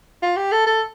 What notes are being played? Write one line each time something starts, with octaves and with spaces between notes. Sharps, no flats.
F4
G4
A4
A4